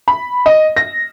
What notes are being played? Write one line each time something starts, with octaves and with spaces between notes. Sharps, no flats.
B5
D#5
A#6